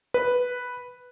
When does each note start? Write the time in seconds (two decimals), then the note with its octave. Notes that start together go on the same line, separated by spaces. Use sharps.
0.14 B4